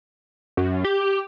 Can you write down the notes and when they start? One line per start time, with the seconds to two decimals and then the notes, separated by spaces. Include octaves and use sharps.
0.57 F#2
0.84 G4